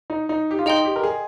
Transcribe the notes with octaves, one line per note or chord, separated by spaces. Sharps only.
D#4
D#4
G4
F4
D#4 G#4 D#5 G5 C6 G6
G4
A#4
G#4